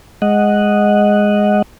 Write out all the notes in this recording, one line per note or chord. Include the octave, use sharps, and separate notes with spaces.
G#3 D#5 F#5